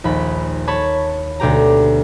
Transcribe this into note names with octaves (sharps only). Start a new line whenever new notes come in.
A#1 D#2 B5
C#5 A5 B5 C#6
D2 B2 G4 A#5